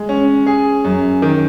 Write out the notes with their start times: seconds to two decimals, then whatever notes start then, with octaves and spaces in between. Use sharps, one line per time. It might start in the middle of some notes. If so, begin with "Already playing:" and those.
Already playing: G#3
0.09 C#4
0.47 G#4
0.85 F#2
1.22 D#3